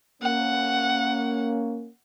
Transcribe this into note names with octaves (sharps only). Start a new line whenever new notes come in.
A#3 C#4 F#5